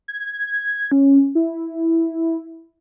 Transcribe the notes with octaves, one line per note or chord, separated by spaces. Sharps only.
G#6
C#4
E4